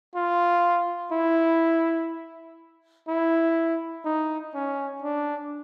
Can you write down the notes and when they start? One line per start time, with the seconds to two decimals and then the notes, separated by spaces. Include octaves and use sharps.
0.15 F4
1.12 E4
3.08 E4
4.05 D#4
4.54 C#4
5.02 D4